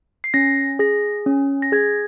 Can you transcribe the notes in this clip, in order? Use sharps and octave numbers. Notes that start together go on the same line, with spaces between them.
C7
C#4 A#6
G#4 A#6
C#4
A#6
G#4 G#6